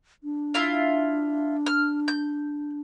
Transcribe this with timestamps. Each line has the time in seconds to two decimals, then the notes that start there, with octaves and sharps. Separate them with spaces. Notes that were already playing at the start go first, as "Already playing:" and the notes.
0.24 D4
0.54 E4 F4 F5
1.66 F6
2.08 G6